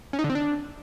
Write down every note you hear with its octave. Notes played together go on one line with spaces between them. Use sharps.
C#4
D#4
D3
C4
D4